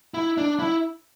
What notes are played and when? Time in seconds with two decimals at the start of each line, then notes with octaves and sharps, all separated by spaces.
0.14 E4
0.38 D4
0.59 E4